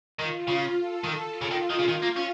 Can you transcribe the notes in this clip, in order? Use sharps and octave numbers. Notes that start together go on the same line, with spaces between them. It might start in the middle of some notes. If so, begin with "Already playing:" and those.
D#3 F4
C#3
A4
D#3
F4
C#3
D#3
D#3
C#3
D#3
A#3
C#4